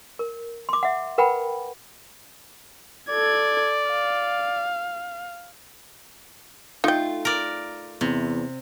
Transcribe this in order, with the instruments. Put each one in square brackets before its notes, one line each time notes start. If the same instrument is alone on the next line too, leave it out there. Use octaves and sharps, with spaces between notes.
[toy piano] A#4
C6 D6
E5 F#5
A#4 B4 F#5 G5 B5
[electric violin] A4 G#6 [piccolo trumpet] D5
[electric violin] F5
[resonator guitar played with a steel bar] A3 F4 [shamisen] D#4 G5
[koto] A#4 D5
[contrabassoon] E2 [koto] C3